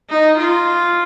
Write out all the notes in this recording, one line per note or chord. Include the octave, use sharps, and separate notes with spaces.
D#4
F4